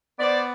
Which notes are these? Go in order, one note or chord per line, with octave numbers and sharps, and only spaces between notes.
B3 C5 D5